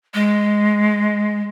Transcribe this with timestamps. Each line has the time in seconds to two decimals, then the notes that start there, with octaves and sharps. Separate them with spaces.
0.14 G#3